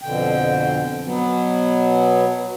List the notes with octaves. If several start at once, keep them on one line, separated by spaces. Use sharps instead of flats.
F2 B2 D3 G5
B2 F#3 B3